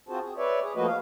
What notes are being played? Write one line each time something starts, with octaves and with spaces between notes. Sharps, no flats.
C4 F4 F#4 G#4 C5 A5
G#4
B4 C#5 D5 E5
G#4
F3 A3 A#3 F#4 B4 D#5
F5